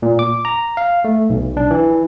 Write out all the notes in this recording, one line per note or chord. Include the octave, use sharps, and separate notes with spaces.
A#2
D6
A#5
F5
A3
B1
D4
E3